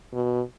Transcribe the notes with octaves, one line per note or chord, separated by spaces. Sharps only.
B2